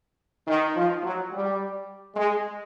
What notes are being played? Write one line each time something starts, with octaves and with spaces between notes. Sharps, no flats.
D#3
F3
F#3
G3
G#3